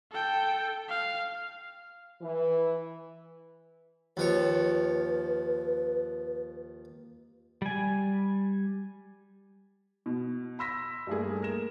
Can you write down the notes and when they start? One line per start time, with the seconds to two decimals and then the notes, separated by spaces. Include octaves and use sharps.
0.11 A4 G5
0.88 F5
2.22 E3
4.17 D#2 F3 B4 C#5
7.62 G3 G#5
10.06 B2
10.59 B5 C6 E6 A#6 B6
11.07 G2 G3 A3 A#3 G#4
11.42 A#4 E7